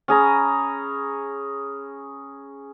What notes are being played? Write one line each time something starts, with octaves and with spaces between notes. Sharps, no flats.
C#4 G#4 A#5 B5